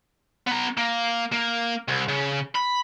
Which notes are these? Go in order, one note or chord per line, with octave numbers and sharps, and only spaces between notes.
B3 A#5
A#3
A#3
C2
C#3
B5